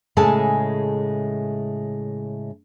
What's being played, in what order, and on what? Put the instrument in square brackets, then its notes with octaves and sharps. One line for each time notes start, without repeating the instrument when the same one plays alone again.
[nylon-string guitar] A2 C#3 G#3 G#4 A4 A5